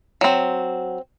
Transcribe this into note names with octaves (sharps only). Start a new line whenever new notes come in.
F#3 C4